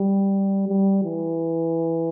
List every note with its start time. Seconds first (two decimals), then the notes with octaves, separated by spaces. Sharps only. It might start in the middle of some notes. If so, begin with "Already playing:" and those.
Already playing: G3
0.69 G3
1.04 E3